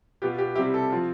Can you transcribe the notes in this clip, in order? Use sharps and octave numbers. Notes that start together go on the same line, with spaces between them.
B2 B3 F4 G4
G4
C3 G3 C4 E4 G4
A4
F3 C4 F4